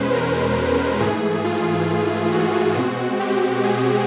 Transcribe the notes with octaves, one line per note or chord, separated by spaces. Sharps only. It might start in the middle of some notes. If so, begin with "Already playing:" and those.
Already playing: E2 B2 G#3 C#4 B4 C5
A#4
G#2 E3 A3 G#4
F4
F#4
B2 G#3 C4
G4
G#4